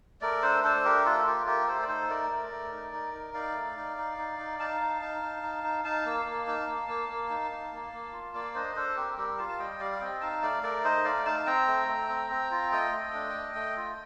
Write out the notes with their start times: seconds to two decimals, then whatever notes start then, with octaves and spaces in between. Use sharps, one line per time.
0.21 A3 A#4 D5
0.42 D4 A4 C5
0.63 D4 A4 C5
0.85 A3 G4 A#4
1.05 F4 A4
1.26 F4 G4 A#4
1.46 A3 G4 A#4
1.67 A3 A4 C5
1.82 D5
1.88 D#4 A4 C5
2.09 A3 A#4 D5
2.30 A3
2.51 A3
2.72 D#4
2.93 D#4
3.13 D#4
3.34 D#4 D5 F5
3.55 A3
3.76 D#4
3.97 D#4
4.18 D#4
4.39 D#4
4.59 D#4 F5 A5
4.81 D#4
5.01 D#4
5.22 D#4
5.43 D#4
5.64 D#4
5.84 D#4 F5 A5
6.05 A#3
6.25 A#3
6.47 D#4
6.67 A#3
6.88 A#3
7.09 A#3
7.30 D#4
7.51 D#4
7.72 A#3
7.93 A#3
8.13 F4
8.34 A#3 D5 F5
8.55 D4 C5 D#5
8.75 D4 A4 C5
8.96 C4 G4 A#4
9.18 G3 G4 A#4
9.38 F4 F5 A5
9.49 A5
9.59 G3 D#5 G5
9.80 G3 D5 F5
9.92 F5
10.00 C4 D#5 G5
10.21 D#4 F5 A5
10.42 A3 D5 F5
10.63 A3 A#4 D5
10.84 D#4 C5 D#5
11.04 A3 D5 F5
11.26 D#4 F5 A5
11.40 A5
11.46 C4 G5 A#5
11.67 A3
11.88 A3
12.09 C4
12.31 C4
12.51 F4
12.72 A3 D#5 G5
12.92 A3
13.14 D4
13.34 A3
13.55 A3
13.76 F4